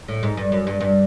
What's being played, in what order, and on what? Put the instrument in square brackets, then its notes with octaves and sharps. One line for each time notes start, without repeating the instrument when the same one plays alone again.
[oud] A2
G#2
G2
F#2
G2
G2